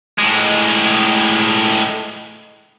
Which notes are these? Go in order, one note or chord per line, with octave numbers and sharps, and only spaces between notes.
A2 G#3